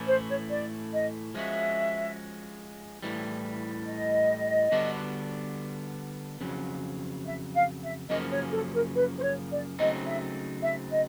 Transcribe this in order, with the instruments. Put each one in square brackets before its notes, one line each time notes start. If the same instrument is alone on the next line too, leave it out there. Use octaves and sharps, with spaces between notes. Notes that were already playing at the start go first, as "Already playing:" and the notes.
Already playing: [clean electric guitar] A2 E3 A3 C#4 E4
[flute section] C5
C#5
D5
D#5
[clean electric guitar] F3 G#3 C#4 F#4 [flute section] E5
[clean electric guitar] A2 E3 G3
[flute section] D#5
[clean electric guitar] D3 G3 B3 D4 F#4
F2 C#3 F#3
[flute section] E5
F5
E5
[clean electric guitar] F#2 C#3 F3 A#3 C#4 [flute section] D#5
[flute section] C#5
A4
A#4
B4
C5
C#5
D5
[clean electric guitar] C#3 F#3 A3 C4 D#4 [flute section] D#5
[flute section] E5
E5
D#5